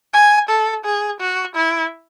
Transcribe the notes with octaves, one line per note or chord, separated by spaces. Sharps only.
G#5
A4
G#4
F#4
E4